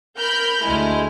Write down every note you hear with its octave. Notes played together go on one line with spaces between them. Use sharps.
A#4 B5 F6 G6
D2 G#3 A3 E4 F6